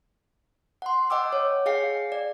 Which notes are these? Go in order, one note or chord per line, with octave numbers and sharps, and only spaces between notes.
F#5 C6
D#5 F#5 G5 D6 E6
C#5
G#4 F5 G5 C7
D5